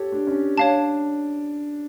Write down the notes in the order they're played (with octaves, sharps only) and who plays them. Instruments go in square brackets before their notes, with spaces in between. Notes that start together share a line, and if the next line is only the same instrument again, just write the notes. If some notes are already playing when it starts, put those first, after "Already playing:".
Already playing: [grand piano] G4 A4 C#5
D4
C#4
[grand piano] D4 [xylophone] C#5 F5 A5